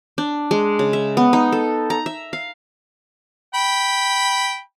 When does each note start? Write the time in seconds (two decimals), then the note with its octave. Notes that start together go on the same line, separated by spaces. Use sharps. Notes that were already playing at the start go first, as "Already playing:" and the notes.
0.18 D4
0.51 G#3
0.79 C#3
0.93 E5
1.17 B3
1.33 D#4
1.52 A4
1.90 A#5
2.06 E5
2.33 F5
3.54 G5 B5